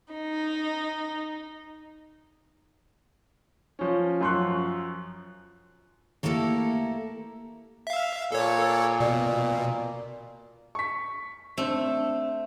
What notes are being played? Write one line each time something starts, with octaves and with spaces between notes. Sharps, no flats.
D#4
F3 C#4
F#2 F3 C6 C#6 F#6
A3 A#3 E4 G4 A4 A#4
E5 F5
A#2 A4 C#5
E6
B2 D5
C#6 B6
A3 C4 D4 C5